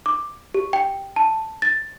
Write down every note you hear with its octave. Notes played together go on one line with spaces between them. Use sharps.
D6
G4
G5
A5
A6